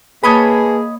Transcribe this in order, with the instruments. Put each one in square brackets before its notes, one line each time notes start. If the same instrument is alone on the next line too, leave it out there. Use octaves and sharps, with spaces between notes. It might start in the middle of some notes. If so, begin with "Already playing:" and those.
[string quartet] A#3 [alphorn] G#4 [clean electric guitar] B4 A5 [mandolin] C#5 D#5 B5